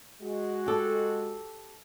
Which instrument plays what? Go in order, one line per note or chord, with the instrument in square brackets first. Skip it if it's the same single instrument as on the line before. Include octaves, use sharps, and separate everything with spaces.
[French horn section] G#3 F#4
[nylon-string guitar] G4 A4